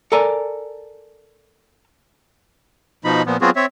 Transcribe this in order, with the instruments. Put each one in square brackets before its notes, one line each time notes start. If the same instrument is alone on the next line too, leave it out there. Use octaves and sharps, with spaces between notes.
[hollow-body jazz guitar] A4 A#4 D5 G#5
[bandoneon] B2 F3 D#4 B5
A#2 F3 B3
F#3 B3 C4 F4 F#4 G#4
C4 C#5 E5